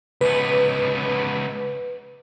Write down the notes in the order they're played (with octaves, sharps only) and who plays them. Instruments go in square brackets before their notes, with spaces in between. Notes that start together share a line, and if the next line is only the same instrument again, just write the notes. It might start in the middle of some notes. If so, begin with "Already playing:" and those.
[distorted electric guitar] C#2 B3 [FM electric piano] B4